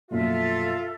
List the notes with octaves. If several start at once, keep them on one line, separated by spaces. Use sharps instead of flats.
A#1 F#2 B2 F4 A4 E5